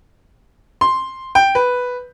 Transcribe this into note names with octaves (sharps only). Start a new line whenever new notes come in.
C6
G5
B4